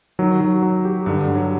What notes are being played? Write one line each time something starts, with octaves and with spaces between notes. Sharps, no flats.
D#3 F#3
F#3
F#3
G4
G2 D3
G2
F#3